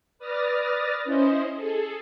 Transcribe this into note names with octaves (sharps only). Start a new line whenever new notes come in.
B4 D5 D#6 F6 A6 A#6
C#4 E4 C5 D#5
G#4 A4